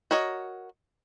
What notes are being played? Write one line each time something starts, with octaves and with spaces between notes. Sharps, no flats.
F#4 A#4 C#5 D#5